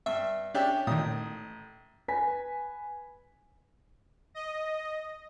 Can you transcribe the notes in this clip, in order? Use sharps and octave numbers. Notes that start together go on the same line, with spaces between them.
G2 E5
C#4 D4 G4 E5
A1 A#2 D#3 D#6
B4 G#5 B6
D#5